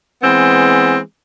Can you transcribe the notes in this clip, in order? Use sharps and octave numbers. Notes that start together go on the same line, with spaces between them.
E3 G#3 B3 C4